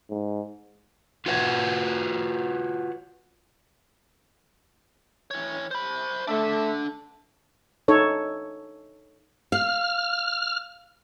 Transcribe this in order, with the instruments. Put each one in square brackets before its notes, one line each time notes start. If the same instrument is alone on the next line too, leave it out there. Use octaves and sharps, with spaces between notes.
[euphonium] G#2
[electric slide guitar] F4 F#4 B4 C#5 F#5
[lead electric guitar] E3 C#5
C5 B5
[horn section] A3 E5 [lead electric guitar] D4 A4
[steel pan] D#4 A4 C#5
[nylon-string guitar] F5 [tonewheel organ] F6